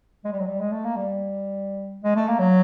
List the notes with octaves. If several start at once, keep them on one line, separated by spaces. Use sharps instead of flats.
G#3
G3
F#3
G3
G#3
A3
A#3
G3
G#3
A3
A#3
F#3